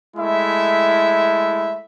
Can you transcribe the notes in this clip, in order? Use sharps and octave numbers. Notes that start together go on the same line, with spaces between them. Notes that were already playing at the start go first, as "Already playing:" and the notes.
G#3 A3 E4 E5